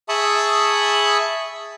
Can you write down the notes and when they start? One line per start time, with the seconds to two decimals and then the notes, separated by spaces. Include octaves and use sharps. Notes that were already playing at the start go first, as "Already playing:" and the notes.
0.09 G#4 E5 A5 B5 C#6 D#6